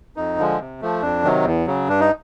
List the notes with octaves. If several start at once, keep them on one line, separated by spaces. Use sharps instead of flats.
F2 D#4
D3 F3 G#3
C3
F3 A3
F2 D4
C3 D#3 F#3
E2
C#3 F#3
G2 D4
D#4